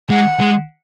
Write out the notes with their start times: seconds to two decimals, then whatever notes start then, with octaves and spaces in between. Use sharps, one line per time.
0.10 G#3 F#5
0.41 G#3